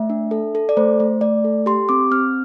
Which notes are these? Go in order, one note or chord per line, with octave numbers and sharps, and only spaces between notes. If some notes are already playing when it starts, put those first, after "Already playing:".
Already playing: A3 E5
D4
A4
A4
D5
A3 C5
A3
A3 D5
A4
G4 C6
C4 D6
C4 F6